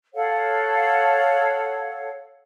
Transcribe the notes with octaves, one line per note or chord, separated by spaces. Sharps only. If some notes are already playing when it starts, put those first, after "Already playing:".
A4 C#5 F5 F#5